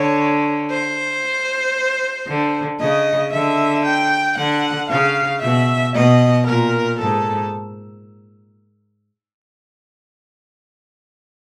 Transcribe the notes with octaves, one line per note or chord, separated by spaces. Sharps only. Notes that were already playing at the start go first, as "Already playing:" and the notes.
Already playing: D3 C#5
C5
D3
C#3 D#5
D3 E5
G5
D3 F#5
C#3 F5
B2 E5
B2 D#5
A#2 A#4
G#2 A4